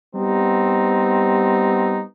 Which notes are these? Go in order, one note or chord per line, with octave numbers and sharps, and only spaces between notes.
G3 B3 C4 D#4